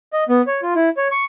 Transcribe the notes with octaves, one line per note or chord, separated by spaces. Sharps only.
D#5
B3
C#5
F4
E4
C#5
C#6